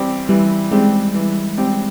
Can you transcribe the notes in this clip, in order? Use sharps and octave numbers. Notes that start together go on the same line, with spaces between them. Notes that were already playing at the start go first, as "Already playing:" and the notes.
Already playing: E3 G3 C4 G4
E3 G3
G3 G#3 C4 G4
E3
G3 C4 G4